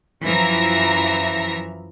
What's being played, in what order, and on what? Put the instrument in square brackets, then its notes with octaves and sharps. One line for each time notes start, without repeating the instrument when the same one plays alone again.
[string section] F#2 E3 F3 E5 A#5 A#6